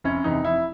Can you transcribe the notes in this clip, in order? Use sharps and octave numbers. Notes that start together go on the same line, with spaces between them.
F1 C#4
E2 C3 D#4
F1 E4